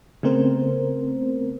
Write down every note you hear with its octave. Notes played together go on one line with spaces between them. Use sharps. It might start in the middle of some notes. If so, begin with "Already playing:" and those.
C#3 A3 B3 C4 A#4 C5